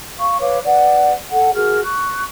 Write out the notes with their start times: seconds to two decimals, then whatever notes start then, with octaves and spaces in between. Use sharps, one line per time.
0.20 F5 C#6
0.40 B4 C#5 F5 D6
0.65 B4 D5 F#5
1.31 A4 F#5
1.54 F#4 G#4 A#4 F6
1.83 C#6 F#6